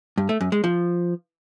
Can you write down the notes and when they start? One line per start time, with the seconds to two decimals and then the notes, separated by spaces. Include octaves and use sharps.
0.18 G2
0.29 A3
0.41 F#2
0.52 G#3
0.64 F3